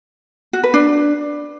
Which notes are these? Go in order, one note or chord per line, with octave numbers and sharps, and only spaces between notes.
F#4
B4
D4